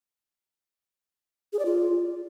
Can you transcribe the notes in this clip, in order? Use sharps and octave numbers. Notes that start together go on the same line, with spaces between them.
G#4
D5
F4